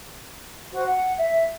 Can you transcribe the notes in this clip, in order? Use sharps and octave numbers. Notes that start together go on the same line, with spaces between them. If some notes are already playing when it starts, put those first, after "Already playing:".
F#4 C5
F#5
E5